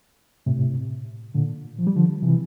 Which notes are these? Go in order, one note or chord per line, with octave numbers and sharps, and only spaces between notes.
A2 C3
A#2 D3
F3
G3
D3 F3
C3 E3